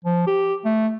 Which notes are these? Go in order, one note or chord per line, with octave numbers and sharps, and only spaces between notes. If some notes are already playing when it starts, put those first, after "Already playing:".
F3
G4
A3